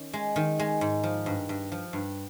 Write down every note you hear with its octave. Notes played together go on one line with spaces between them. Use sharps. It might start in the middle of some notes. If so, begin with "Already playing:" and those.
Already playing: D#3 C#4
G#3
D#3
G#3
G#2
F3
G2
G2
F3
G2